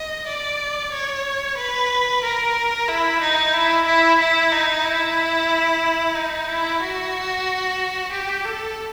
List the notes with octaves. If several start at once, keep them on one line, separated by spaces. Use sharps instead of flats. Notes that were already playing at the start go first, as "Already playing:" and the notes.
Already playing: D#5
D5
C#5
B4
A#4
E4
D#4
E4
E4
E4
D#4
E4
D#4
E4
F#4
G4
A4